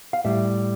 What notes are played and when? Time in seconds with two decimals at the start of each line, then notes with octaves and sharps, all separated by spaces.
0.13 F5
0.24 A2 G3 E5